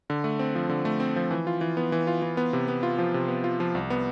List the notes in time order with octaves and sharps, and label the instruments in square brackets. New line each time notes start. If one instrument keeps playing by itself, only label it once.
[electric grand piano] D3
A3
C4
F3
D3
A3
C4
F3
E3
F4
E3
B3
E3
F4
E3
B3
C3
B3
F4
F3
C3
B3
F4
F3
C2
B3